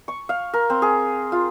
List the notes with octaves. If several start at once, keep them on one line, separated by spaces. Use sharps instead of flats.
C#6
F5
A#4
C4
G#4
F4